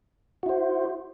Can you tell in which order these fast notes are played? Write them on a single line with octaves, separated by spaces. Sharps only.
F#4 E4 C5